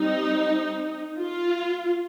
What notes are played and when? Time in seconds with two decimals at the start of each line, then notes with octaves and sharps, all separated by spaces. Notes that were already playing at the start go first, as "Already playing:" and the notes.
Already playing: G3 C4 D#4
1.18 F4